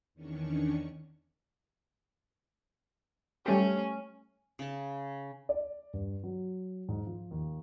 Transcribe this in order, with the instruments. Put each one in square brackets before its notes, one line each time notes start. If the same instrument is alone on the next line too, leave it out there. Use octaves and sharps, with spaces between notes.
[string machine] E2 D#3 C#4 D4 C#6
[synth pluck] G3 A3 G4 [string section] C#4
[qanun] C#3 A5
[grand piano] D5
G2
F#3
G#2
F3
D#2